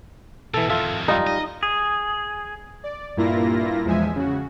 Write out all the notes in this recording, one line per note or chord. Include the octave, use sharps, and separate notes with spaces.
B2 E3 A4
F2 D#3 F4 A4 E5
G3 D#4 F4
D#5
G#4
D5
G2 A#2 A#3 E4 F4 A#6
E2 F3 G#3 E5 G#5
C#3 F#4